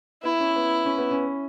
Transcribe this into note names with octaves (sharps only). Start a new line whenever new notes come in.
B3 E4
C#4
B3
C#4
B3
C#4